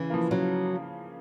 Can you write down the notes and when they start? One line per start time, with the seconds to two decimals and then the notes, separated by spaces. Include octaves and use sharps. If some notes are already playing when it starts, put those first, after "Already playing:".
Already playing: C#3 E3
0.10 F3 A#3
0.31 C#3 F#3